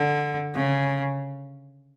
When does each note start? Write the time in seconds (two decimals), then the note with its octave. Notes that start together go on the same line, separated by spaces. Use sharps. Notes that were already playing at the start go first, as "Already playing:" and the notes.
Already playing: D3
0.55 C#3